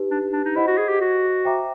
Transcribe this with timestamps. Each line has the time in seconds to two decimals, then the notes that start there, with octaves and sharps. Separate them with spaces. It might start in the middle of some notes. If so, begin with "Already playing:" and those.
Already playing: D#4 G4 B4
0.10 D4
0.32 D4
0.44 D#4
0.55 E4 C5 D#5 F#5
0.67 F#4
0.78 G#4
0.89 G4
1.00 F#4
1.45 C5 E5 G5 A#5 D6